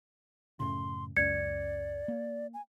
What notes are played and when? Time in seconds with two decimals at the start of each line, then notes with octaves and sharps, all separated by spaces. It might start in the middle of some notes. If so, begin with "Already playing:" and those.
0.60 F#2 A2 C#3 C6
1.17 C#2 F#2 D5 G#6 C#7
2.08 A#3
2.54 G#5